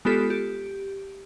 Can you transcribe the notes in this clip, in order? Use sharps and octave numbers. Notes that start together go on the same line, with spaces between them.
G#3 B3 F4 G4 A4 B6
G4